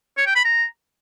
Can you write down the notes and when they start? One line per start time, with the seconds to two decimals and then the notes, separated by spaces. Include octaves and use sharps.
0.18 C#5
0.27 G5
0.36 B5
0.45 A#5